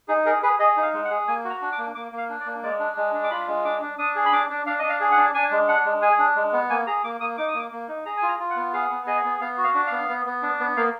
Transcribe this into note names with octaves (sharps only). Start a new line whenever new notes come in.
D#4 G#4
G#4 A#4
G#4 B4
G#4 D#5
D#4
F5
G#3
F#5
G#4
A#3 G#5
F#4
A#5
D4
D6
A#3
A#3 D6
A#3
F5
D4
D5
A#3
G#3 D5
D4
G#3
D4
D6
F4 B5
G#3
D4 D6
D4
D4 D#6
G#4
B5
D4 D6
D4
D4 F5
D4 D#5
F5
G#4
F#5
D4
D4 G#5
G#3
D4 F#5
G#3
G#4 G#5
D4
G#3
B3
A#3 G#5
G#4 A#5
A#3 D6
A#3 D#6
D#4 D6
D#6
A#3 D6
A#3
D#4
G#4 A#5
G#5
F4
A#5
F4
F#5
B3
G#4 F5
B3
G#4 D#5
B3
B3 F5
F#4
F5
D4
B3 F5
B3
B3
D4
B3
A#3 F5